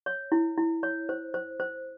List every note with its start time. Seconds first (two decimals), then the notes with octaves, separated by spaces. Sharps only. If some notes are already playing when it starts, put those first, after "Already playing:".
0.06 C#5
0.32 E4
0.57 E4
0.83 C#5
1.09 C5
1.34 C5
1.60 C5